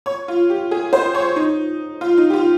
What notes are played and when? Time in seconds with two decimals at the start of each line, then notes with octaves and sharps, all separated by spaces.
0.06 C#5
0.28 F4
0.50 G4
0.71 G#4
0.93 C5
1.15 C#5
1.36 D#4
2.01 F4
2.17 D#4
2.30 G4
2.33 F4